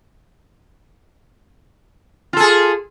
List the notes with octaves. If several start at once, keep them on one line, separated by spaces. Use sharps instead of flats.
F4 G#4 A4